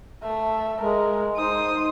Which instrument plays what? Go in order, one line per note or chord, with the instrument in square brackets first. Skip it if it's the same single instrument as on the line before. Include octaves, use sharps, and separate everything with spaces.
[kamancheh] A3 E5
[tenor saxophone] G#3 [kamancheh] A#4
[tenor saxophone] D#4 [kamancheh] C5 D#6